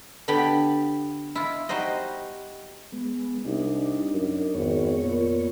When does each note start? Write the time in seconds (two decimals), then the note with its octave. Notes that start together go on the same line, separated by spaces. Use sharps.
0.28 D3 B3 G4 G5 B5
1.35 E4 F4
1.69 G3 D#4 F#4 C5 D#5
2.92 G#3 B3
3.45 C2 D4 D#4
4.14 F#2
4.54 G#1 F2 B3 C#5
5.03 A#2